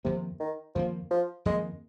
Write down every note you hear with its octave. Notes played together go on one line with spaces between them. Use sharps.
F2 C3 D#3 A#3
D#3
F2 D#3 F3 A#3
F3
F2 D#3 G#3 A#3